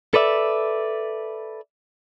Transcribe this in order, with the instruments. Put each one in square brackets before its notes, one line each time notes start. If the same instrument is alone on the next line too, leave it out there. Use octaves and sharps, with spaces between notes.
[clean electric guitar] A4 B4 D5 E5